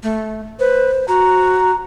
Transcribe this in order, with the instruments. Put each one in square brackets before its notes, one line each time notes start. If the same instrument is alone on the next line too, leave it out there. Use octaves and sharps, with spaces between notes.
[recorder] A3
[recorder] B4 [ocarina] C5
[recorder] F#4 [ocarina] A#5